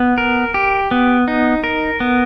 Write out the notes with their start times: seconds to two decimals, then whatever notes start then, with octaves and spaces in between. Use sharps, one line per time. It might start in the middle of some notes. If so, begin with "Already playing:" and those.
Already playing: B3
0.18 A#4
0.54 G4
0.91 B3
1.28 D#4
1.64 A#4
2.00 B3